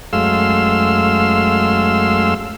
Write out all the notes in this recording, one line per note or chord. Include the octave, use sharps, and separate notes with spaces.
F#2 G#3 A3 F5 C6 E6